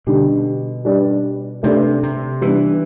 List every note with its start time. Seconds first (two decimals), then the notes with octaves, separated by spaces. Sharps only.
0.07 B2 D3 G3 D4 G4
0.85 G3 D4 G4 B4 D5
1.63 C3 A3 D4 G4 B4 D5
2.03 C3
2.41 E3 G3 B3 D4